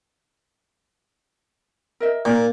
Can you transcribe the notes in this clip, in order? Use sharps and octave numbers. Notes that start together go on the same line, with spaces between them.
A#4 D#5 E5
A#2 D#4 A#4